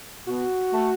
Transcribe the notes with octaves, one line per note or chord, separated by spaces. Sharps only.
B2 F#4
A3